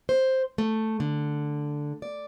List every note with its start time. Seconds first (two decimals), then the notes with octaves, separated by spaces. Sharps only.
0.09 C5
0.58 A3
1.00 D3
2.02 D5